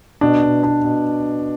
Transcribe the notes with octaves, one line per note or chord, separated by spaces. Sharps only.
B2 D4
B2
B2 D4
B2